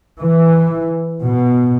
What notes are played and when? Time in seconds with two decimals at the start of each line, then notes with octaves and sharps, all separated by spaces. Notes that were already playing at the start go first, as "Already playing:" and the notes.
0.19 E3
1.24 B2